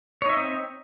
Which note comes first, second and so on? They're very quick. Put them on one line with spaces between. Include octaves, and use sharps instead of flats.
C#5 D#4 E5 D#5 C4